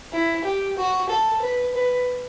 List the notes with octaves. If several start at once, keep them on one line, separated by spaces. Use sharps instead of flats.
E4
G4
F#4
A4
B4
B4